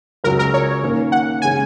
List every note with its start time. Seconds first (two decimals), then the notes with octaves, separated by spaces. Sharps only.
0.24 C#2 C#3 F#3 C#4 F#4 A#4
0.39 A#4
0.54 C#5
0.82 D#3 A#3 C#4 A#4
1.12 F#5
1.42 C#3 G#3 C#4 G#5